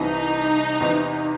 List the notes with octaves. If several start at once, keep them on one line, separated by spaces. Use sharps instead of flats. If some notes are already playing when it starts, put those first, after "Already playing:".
Already playing: C2 C3 E3 D#4
E2 C3 E3